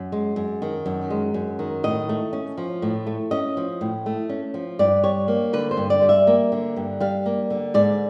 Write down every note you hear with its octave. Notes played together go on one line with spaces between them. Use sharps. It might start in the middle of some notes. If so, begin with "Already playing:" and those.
Already playing: F#2
G#3
F#2
D#3
F#2
G#3
F#2
D#3
A2 D#5
A3
C#4
F3
A2
A3
C#4 D#5
F3
A2
A3
C#4
F3
G2 D5
G3 C#5
A#3
D3 B4
C5
G2
D5
G3
E5
A#3
D3
G2
G3 F5
A#3
D3
G#2 D5